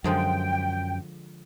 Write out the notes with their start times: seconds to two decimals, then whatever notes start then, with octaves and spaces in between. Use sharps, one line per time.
0.04 F#2 D3 F3 G#3 G5